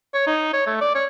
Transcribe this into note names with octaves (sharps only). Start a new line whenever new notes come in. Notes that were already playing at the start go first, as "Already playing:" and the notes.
C#5
D#4
C#5
A3
D5
C#5